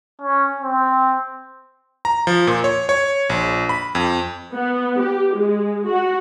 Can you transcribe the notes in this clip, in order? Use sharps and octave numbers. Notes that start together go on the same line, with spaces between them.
C#4
C4
A#5
F3
A#2
C#5
C#5
A#1
B5
F2
B3
G4
G#3
F#4